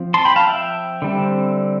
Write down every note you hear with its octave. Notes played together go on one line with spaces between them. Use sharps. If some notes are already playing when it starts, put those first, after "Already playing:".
Already playing: F3 C4
A5 C6
G5 B5
F5 A5
E5 G5
D3 G3 C4